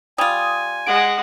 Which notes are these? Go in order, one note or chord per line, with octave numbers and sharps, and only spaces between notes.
G3 F4 G#5 D#6
G#3 F#5 D7